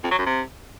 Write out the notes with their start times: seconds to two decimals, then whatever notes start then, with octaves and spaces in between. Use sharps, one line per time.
0.04 F2
0.11 F#3
0.19 F#2
0.26 C3